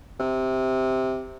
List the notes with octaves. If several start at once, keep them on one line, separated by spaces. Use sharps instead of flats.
C3